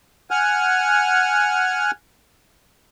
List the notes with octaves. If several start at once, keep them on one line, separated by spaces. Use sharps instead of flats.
F#5 G#5 F6